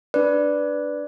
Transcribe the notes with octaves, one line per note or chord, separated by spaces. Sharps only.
D4 B4 D5